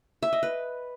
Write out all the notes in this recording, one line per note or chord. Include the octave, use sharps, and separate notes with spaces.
E5
D#5
B4